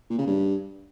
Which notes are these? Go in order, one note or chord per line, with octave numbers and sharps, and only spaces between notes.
A#2
C#3
G2